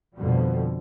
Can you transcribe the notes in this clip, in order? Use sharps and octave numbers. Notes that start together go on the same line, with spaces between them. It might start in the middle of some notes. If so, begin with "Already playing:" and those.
F2 B2 D3 F3 G3